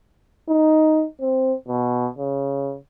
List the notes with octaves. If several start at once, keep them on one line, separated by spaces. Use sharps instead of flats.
D#4
C4
B2
C#3